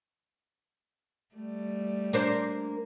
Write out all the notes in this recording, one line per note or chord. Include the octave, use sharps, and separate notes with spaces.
G3 A3
A#3 D4 C5